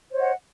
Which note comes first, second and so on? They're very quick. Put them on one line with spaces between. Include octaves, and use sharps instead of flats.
C5 C#5 D#5 F#5